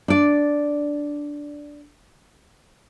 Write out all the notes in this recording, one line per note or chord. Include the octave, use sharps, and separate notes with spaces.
D4 D5